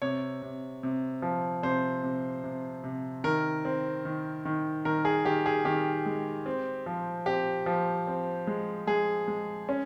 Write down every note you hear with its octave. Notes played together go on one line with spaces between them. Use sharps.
C3 C#5
C3
C3
F3
C3 C5
C3
C3
C3
D#3 A#4
C4
D#3
D#3
D#3 A#4
G#4
D#3 G4
G#4
D#3 G4
G#3
C4
F3
C4 G4
F3
C4
G#3
G#3 G#4
G#3
C#4